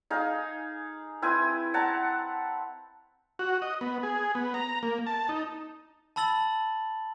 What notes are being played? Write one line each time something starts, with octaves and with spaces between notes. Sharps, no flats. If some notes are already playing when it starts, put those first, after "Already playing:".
D#4 G#4 F5
C4 E4 B4 G#5
F#5 A5 A#5
F#4
D#5
B3
G#4
B3
A#5
A#3
A5
D#4
A5 B5 E6 A6 F#7